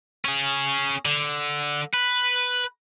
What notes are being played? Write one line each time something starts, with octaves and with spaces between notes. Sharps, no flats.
C#4 G#4
D3
B4